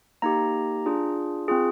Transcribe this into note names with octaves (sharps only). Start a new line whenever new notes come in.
A#3 D#4 G4 A#5
D4 F4 G#4
C4 F4 G#4